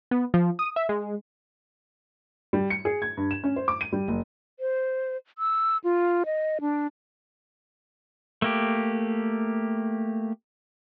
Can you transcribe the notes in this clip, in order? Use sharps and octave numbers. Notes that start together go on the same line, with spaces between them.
B3
F3
D#6
E5
G#3
G3
C#7
G#4
G#6
G2
E7
C#4
C5
D6
D#7
G3
F#1
C5
E6
F4
D#5
D4
A3 A#3 G4